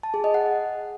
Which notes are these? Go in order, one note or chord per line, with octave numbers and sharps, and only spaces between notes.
A5
G#4
D#5
F#5